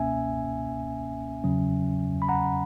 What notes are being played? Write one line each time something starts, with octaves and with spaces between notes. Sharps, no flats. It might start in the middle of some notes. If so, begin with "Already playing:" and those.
Already playing: C#2 B2 A#3 C#4 E5 G#5
E2 C#3 F#3 C#4
B5
F#5 A#5